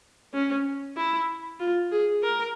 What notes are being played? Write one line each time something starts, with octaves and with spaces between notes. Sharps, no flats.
C#4
E4
F4
G#4
A#4